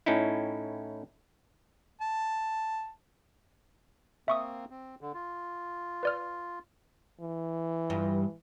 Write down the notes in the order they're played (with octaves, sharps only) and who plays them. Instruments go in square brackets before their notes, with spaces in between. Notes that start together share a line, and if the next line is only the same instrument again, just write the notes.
[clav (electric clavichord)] A2 C#4 D#4 E4
[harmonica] A5
[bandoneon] A#3 C4 [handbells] E5 C#6 D#6
[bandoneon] C4
D3
F4
[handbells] B4 D5 F6
[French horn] E3
[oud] G2 F4